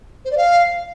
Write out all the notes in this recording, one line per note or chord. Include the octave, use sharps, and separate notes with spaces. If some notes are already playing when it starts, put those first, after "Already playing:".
C5
D5
F5